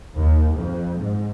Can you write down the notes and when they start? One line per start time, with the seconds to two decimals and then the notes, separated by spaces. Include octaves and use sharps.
0.17 D#2
0.55 F2
0.98 G#2